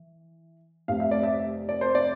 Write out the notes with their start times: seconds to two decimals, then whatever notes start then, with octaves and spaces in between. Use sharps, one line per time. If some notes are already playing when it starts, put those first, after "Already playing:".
Already playing: E3
0.88 F1 F2 C3 F5
1.00 E5
1.11 D5
1.23 E5
1.69 D5
1.81 C5
1.95 D5